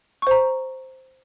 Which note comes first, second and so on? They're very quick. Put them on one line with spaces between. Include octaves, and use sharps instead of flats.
C#6 C5 A#5